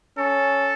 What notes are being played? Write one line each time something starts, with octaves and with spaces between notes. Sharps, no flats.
C#4 A4